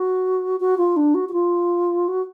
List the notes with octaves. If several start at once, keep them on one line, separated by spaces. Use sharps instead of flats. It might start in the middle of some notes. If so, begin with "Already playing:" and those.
Already playing: F#4
F#4
F4
D4
F#4
F#4
F4
F#4